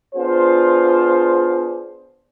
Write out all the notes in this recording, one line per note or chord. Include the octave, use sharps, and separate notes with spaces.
B3 D4 F4 G#4 C5